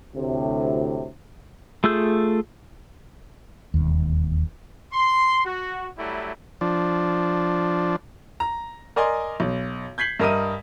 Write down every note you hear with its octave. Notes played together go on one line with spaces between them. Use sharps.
D2 A2 C3
A3 F4 G#4 E6 G6
E1 D#2
C6
F#4
F#3 G3 A3 E4
F3 D4
A#5
A#4 D5 D#5 G#5 C6
B1
G6 G#6 B6 C7 F#7
G2 A#4 D#5 E5 D#6 D#7